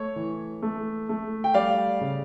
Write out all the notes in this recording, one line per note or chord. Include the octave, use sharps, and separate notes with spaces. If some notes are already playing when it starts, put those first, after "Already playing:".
Already playing: A3 C#5
E3
A3
A3
G5
G3 D5 F5
C#3